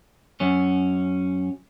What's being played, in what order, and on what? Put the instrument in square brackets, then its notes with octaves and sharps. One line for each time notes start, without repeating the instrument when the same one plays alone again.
[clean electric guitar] F#2 C#4